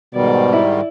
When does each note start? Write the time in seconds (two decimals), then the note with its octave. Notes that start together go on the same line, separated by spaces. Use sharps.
0.15 G#2 B2 D#3 G3 D5
0.53 E4